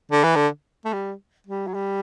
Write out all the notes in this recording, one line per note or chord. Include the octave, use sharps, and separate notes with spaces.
D3
E3
D3
A3
G3
G3
F#3
G3